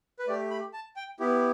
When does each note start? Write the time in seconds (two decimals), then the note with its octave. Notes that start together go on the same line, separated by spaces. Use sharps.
0.19 B4
0.28 A3 G4 D5
0.51 B5
0.73 A5
0.96 G5
1.20 B3 E4 G4